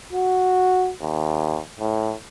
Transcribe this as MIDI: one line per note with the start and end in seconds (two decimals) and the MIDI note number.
0.13 0.91 66
1.02 1.60 39
1.80 2.14 45